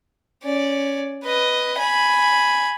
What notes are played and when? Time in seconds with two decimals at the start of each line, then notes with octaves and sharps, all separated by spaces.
0.43 C#4 D5
1.24 B4 D#5
1.78 G#5 B5